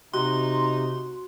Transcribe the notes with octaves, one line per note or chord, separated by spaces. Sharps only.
C3 D#4 F#4 C6